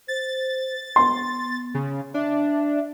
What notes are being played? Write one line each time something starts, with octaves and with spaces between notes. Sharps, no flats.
C5 A6
B3 C6
C#3
D4 E5